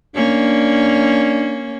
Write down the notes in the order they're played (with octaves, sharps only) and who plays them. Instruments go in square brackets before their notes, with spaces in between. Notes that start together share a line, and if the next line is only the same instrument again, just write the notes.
[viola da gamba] A#3 C#4 [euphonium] D4